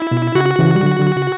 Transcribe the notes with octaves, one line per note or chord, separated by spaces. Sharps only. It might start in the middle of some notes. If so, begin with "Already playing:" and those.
Already playing: E4
B2
C#3 F#4
C#3 E3
G3
D3 F#3
D3 F#3
C#3